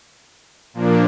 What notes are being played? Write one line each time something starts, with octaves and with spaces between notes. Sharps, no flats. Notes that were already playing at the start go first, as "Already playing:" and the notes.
A#2 F3 A#3 D4